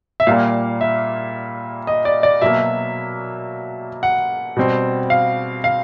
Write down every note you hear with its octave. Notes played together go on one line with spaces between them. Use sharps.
E5
A#2 G3 A#3 F5
E5
D#5
D5
D5
B2 F#3 A#3 E5
F#5
B2 G3 C4
F5
F5